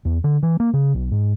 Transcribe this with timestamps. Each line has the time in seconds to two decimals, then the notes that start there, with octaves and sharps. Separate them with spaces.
0.05 E2
0.24 D3
0.43 E3
0.60 A#3
0.74 C#3
0.95 B1
1.11 G#2